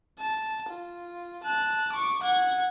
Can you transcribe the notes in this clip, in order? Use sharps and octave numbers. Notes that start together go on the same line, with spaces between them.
A5
F4
A5 F#6
C#6 D6
F#5 G#6